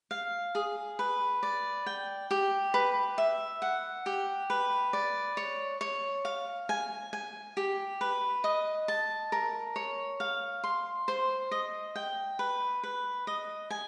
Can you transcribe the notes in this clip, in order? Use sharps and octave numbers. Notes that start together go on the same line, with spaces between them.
F5
G#4
B4
D5
G5
G4
B4
E5
F#5
G4
B4
D5
C#5
C#5
F5
G#5
G#5
G4
B4
D#5
A5
A#4
C#5
F5
C6
C5
D#5
G5
B4
B4
D#5
G#5